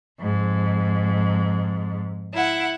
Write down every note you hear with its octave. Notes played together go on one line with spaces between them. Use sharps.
F2 G#2
E4 F#5